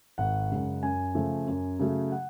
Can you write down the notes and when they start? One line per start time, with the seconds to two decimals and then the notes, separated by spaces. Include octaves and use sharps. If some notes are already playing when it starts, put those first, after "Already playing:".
0.18 G#1 F#5
0.50 F#2 C#3 G#3
0.83 F#2 G#5
1.15 C#3 F3 A3
1.47 F#2
1.79 C#3 F#3 A3
2.12 F#5